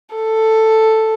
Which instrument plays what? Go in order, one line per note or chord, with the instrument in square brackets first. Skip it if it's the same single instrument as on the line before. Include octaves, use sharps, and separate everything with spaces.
[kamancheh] A4